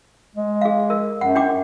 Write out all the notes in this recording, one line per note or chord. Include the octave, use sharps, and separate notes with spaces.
G#3
G#4 F5
A#4
F#2 F#5
D4 G5 D6